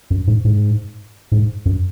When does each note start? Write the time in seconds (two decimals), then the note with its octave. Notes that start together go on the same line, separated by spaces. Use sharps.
0.10 F#2
0.27 G#2
0.45 G#2
1.32 G#2
1.66 F#2